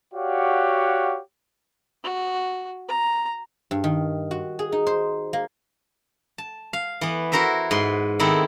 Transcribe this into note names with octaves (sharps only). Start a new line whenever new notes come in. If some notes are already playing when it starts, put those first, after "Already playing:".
F#4 G4 C#5 D5 F5 F#5
F#4
A#5
G2
D#3
F#4
G#4
D#4
C5
A#3
A5
F5
E3 B3
E4 F#4 A#4 C5 E5
G#2 B4 C6
D#3 B3 C4 E4 A4